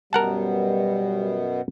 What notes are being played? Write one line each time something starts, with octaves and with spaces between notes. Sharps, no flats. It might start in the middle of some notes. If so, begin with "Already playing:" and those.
F#2 B2 G3 B3 A#4 F#5 A5